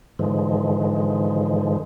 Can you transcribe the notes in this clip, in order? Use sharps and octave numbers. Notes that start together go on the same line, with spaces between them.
G#2 D3 E3 F3 G#3